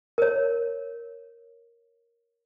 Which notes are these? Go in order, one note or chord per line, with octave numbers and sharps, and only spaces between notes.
A#4 C#5